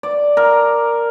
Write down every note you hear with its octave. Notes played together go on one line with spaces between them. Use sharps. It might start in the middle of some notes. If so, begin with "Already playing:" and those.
D5
A#4